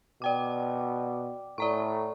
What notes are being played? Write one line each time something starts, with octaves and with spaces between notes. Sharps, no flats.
B2 D5 G5 D6
A2 D5 A#5 C#6